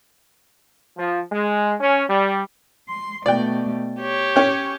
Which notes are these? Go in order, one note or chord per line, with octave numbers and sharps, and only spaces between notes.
F3
G#3
C#4
G3
C6
B2 A3 D5 G5
G4 C#5
C#4 G5